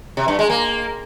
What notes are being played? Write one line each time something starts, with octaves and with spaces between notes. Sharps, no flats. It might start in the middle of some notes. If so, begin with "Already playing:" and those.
C3
G2
G#3
A#3